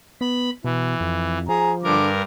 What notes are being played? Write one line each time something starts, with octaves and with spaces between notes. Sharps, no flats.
B3 B5
B2 E3
F2
F3 G#4 A#5
G2 D3 A#4 D6